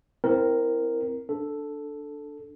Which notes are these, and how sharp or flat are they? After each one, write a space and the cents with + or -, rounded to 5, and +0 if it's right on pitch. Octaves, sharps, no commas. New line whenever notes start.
C4 -10 E4 +0 A#4 +0
D4 +0 A4 +0